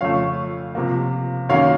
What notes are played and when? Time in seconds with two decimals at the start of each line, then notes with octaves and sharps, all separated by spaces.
0.01 F2 C#3 F3 A3 C#5 F5
0.75 C3 F3 A#3
1.49 F#2 D#3 A#3 C#4 C#5 F5